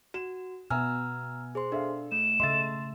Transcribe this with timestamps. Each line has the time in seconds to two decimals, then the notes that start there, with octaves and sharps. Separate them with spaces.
0.14 F#4 E7
0.70 B2 B3 E5 G#5 A#5 E6 F6
1.55 G#4 C5 C6
1.72 D4 A4 E5 F5
2.12 A3 E7
2.40 C#3 A3 D#5 E5 C6 E6 A6